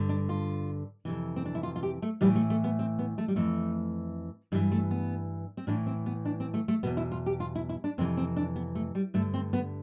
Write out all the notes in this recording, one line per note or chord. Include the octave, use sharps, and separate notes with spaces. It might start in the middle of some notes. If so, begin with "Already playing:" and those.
Already playing: G2 D3
D4
F4
F2 C3 E3
C4
D4
E4
F4
F4
G4
A3
A2 E3 G3
A3
A3
B3
C4
B3
A3
G3
F2 E3 A3
G2 E3 G3
A3
B3
C4
A2 E3 D4
C4
B3
D4
C4
A3
A3
E2 B2 B3
E4
F4
G4
F4
E4
E4
D4
F2 C3 E3 C4
C4
D4
B3
A3
G3
G2 D3 A3
C4
B3